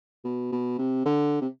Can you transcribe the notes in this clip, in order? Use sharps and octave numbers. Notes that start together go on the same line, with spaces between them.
B2
B2
C3
D3
C3